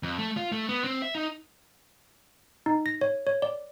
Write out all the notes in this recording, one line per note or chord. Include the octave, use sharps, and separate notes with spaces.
F2
A3
F4
A3
B3
C4
E5
D#4
D#4
A#6
C#5
C#5
D5